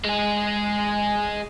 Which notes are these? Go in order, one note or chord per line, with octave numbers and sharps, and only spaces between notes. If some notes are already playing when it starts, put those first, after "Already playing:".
G#3 G#4